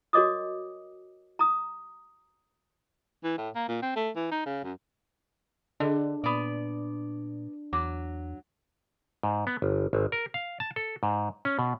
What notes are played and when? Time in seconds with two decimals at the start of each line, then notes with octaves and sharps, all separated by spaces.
0.13 F#4 A#4 C#5 D#5 D6 D#6
1.39 A#5 D#6
3.24 E3
3.38 A2
3.55 A#3
3.68 A#2
3.82 C4
3.96 A3
4.16 E3
4.31 D#4
4.46 C#3
4.64 F#2
5.80 D3 D4 G#4 A4 D#5
6.24 A#2 B3 D5
7.73 E2 F#3 D6
9.23 G#2
9.47 B3
9.62 G1
9.93 G#1
10.12 A#4
10.34 F5
10.60 A5
10.76 A4
11.03 G#2
11.45 C#4
11.59 B2